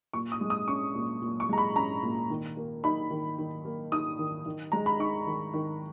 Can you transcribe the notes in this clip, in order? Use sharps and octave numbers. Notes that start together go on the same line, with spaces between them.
A#2 C#6
D#6
G#3
D#6
C#4 C#6
A#2
A#2
C#6
G#3 A#5
B5
C#4 A#5
A#2
D#3
A#3
D#4 B5
D#3
D#3
A#3
D#4 D#6
D#3
D#3
G#3 A#5
B5
D#4 C#6
D#3
D#3